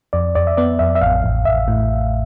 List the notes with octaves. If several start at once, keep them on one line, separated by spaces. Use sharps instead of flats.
F2 D5
F2 D5
E5
B3 D5
F2 E5
E5
A1 F5
A1
A1 E5
A2